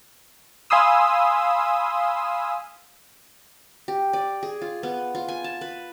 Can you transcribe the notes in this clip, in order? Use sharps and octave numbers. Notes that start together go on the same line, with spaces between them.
F5 G#5 B5 C6 D#6 E6
G4
D5
G#4
F4
B3
F4
G#5
A5
B4